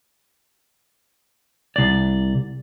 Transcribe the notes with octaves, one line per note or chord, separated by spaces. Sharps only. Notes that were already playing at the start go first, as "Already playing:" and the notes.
C2 D5